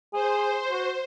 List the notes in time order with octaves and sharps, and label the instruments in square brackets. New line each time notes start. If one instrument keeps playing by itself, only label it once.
[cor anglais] G#4 [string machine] C5
[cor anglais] F#4